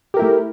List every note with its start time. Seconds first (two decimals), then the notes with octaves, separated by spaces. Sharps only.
0.14 G4
0.17 A#4
0.19 E4
0.22 A3